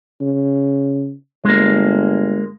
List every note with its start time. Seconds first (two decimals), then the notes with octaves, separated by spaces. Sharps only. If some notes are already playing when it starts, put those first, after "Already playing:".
0.21 C#3
1.45 G1 G#3 A#3